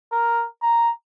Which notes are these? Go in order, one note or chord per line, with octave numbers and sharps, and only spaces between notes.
A#4
A#5